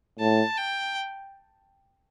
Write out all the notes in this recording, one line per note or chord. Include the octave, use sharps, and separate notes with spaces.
A2 A5
G5